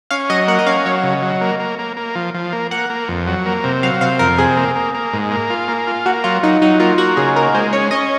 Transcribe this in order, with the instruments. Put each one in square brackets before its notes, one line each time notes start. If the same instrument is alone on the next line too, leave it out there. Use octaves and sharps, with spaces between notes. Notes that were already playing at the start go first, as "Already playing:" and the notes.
[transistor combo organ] C#4 [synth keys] F5
[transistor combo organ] F#3 [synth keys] D#5
[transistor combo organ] A#3 [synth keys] F#5
[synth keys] D#5
[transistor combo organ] C#4 [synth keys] F5
[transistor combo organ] F#3 [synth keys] C#5
[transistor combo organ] C#3
F#3
A#3
A#3
A#3
A#3
F3
F3
A#3
[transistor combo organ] A#3 [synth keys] F#5
[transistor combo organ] A#3
F2
F#3
A#3
C3
[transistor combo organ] F#3 [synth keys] F5
[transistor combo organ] C3 [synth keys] F5
[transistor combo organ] F2 [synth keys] A#4
[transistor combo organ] C3 [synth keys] G#4
[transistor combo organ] A#3
A#3
A#3
G#2
A#3
F4
A#3
F4
[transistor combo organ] A#3 [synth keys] F#4
[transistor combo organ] F#3 [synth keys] F4
[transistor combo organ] F#3 [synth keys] D#4
[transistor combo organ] F#3 [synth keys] D#4
[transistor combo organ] A#3 [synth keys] F4
[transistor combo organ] A#3 [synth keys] F#4
[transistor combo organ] C#3 [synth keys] G#4
[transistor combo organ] A#3 [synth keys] A#4
[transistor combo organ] G#3 [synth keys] C5
[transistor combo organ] C#4 [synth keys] C#5
[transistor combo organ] C#4 [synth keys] D#5